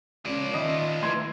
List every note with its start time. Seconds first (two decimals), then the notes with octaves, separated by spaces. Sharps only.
0.25 C#2 F3 C#4 D5
0.53 D#3 D#5 E5 B5
1.03 A3 E4 B4 C6 G#6